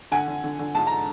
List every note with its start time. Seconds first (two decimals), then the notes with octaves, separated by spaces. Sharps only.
0.12 D3 F#5 G#5
0.28 D3
0.44 D3
0.59 D3
0.75 G#2 A5
0.87 A#5